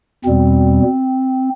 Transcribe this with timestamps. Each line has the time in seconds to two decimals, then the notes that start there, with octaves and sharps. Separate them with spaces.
0.25 E2 B2 G3 C4